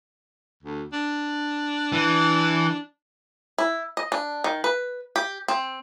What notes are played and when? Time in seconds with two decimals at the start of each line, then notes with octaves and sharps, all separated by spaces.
0.63 D2
0.93 D4
1.92 E3
3.58 E4
3.97 D#5
4.12 D4
4.44 D#3
4.64 B4
5.16 G4
5.48 C4